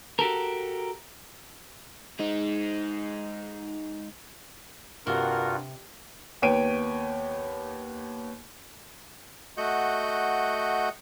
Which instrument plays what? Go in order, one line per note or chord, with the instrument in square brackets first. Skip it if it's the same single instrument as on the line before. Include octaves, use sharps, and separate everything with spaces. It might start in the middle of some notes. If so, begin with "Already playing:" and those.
[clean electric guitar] F#4 G4 A4 A#4
[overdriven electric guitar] G#3 D#4
[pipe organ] G2 F4 F#4 [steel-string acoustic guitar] C3 [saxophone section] A#4 F#5
[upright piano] D#2 B3 C#5 G5 D7 D#7
[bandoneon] A3 F#4 D#5 F#5 G6